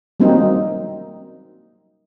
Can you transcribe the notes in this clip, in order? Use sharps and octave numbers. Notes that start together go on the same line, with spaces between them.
F#3 G3 A#3 C4 D#4